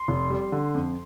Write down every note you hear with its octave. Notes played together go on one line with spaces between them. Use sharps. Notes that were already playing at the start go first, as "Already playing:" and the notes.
Already playing: C6
F1
G3
D3
F2